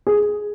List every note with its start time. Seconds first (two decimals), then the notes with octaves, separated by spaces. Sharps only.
0.07 G#4